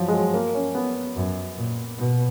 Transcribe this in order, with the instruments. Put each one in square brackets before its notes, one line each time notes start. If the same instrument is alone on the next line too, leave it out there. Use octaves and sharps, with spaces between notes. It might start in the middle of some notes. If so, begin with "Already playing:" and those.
Already playing: [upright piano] F3 F#3
G#3
F#3
A#3
C#4
B3
[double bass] F#2
A#2
B2